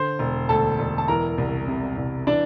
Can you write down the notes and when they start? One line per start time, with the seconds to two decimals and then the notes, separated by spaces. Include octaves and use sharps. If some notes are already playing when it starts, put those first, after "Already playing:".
Already playing: D3 C5 C6
0.19 E1
0.49 D2 A4 A5
0.79 E1
0.98 A5
1.08 E3 A#4 A#5
1.38 C2
1.68 C3
1.97 C2
2.27 E3 D4 D5